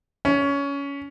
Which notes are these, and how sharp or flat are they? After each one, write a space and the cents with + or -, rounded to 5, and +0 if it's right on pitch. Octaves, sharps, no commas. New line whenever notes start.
C#4 +20